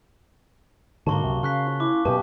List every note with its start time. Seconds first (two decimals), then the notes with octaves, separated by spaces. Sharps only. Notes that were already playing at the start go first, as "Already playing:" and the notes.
1.07 G#2 D3 A#3 F#4 C#5 A5 C6 G7
1.23 C#2 F#2 C3
1.43 C#3 F5 C6 C#6 F#6 B6
1.66 C#4 F4
1.80 E4 D6
2.05 F#2 B2 G4 B4 D#5 G#5 A5